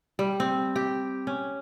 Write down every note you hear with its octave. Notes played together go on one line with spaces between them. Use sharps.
G3
C4
G4
C#4